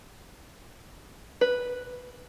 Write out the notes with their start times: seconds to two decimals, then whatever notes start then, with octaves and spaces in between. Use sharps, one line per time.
1.41 B4